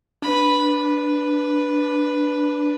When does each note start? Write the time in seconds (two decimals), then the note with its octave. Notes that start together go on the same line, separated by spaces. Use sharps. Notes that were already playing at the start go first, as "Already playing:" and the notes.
0.22 D4 B4 B5
0.64 B4